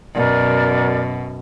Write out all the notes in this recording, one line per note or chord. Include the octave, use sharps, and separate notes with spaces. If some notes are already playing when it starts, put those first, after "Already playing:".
F#2 B2 A#4 D5